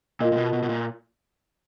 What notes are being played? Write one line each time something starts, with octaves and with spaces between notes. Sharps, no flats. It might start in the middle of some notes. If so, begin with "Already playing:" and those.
A#2 F4 A#4 D#5
A#2
B2
B2
B2
A#2